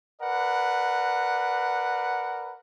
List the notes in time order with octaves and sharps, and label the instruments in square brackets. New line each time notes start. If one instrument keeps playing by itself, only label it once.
[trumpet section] A#4 B4 D5 F#5